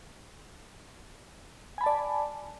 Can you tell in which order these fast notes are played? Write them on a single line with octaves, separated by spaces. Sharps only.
G#5 B5 A5 D5